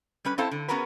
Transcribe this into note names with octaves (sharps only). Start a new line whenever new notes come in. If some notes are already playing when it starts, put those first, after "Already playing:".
G3 C#4 B4
C4 E4 A4 C5 F5 A5
D3
B3 C#4 F#4 G#4 A#4 B4